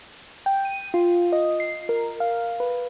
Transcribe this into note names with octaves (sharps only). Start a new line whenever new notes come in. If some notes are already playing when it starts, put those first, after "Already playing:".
G5
D#7
F4
D#5
C7
A#4
F5
B4